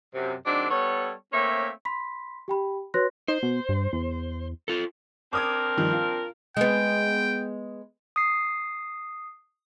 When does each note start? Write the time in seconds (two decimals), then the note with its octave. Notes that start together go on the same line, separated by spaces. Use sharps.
0.15 F#2 C3
0.46 D#3 F#3 G#3 C4 D4
0.70 G3 B3 A4 C#5
1.32 A3 A#3 C4 C#4 C#5 E5
1.85 B5 C6 B6
2.48 G4 G5 B5
2.94 F#4 B4 C#5 C6 F#6 A#6
3.28 D#4 C5
3.43 B2
3.69 G2
3.93 E2
4.68 F4 A4
5.33 C4 D4 A#4 D6 D#6 G#6
5.77 G2 D#3 F3
5.93 F4
6.57 G#3 B3 G5
8.16 D#6 C7